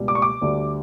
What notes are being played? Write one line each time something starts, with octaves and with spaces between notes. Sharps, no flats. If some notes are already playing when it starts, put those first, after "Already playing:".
Already playing: C#2 B2 G3
D6
C#6
D6
D2 D3 G3